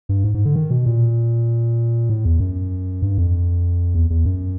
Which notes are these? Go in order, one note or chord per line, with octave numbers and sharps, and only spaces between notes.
G2
G#2
G#2
D3
D#3
B2
A#2
A2
E2
F#2
G2
F2
E2
E2
F#2